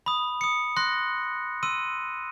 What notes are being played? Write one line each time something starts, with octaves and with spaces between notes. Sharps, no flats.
B5 D#6
D#6 C#7
C6 F#6 A#6
C6 E6 D#7